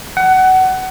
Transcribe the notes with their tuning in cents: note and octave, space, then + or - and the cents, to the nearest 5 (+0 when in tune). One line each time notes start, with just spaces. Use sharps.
F#5 +20